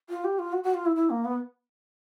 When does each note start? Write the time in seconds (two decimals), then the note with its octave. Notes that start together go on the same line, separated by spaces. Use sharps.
0.09 F4
0.24 G4
0.39 F4
0.53 F#4
0.63 F#4
0.74 F4
0.86 E4
0.96 E4
1.10 A#3
1.25 B3